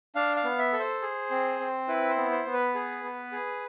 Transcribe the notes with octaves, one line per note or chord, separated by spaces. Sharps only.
D4 F5
F5
B3
E5
A4
C5
G#4
C4
C4
E4 B4
C5
B3
C5
B3
B4
G#4
B3
G#4